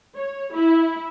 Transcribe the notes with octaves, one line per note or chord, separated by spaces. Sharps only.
C#5
E4